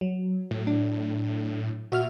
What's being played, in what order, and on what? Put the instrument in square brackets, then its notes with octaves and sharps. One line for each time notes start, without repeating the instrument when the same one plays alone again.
[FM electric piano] F#3
[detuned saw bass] A2
[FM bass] D4
[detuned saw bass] A#2 [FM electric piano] F#4 E5 F6